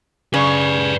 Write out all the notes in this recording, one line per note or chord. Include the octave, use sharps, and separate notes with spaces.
C#3 B4 D5